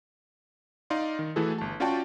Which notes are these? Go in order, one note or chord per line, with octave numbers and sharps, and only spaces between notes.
D#4 D5 F5 C6
D#3
E3 A3 E4 F#4 G#4 A4
G1 A5
C#4 F4 F#4 D5 G5 A5